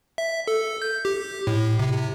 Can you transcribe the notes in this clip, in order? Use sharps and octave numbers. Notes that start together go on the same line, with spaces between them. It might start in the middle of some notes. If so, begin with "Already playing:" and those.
E5
A4
G6
G4
A2
C3